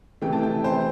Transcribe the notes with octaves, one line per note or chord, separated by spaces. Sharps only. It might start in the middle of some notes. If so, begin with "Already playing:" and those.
C3 E3 A3 G5
A5
G5
C5